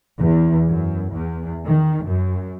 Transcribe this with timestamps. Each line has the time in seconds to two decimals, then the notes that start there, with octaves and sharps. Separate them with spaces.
0.17 E2
0.68 F#2
1.13 E2
1.67 D#3
2.06 F#2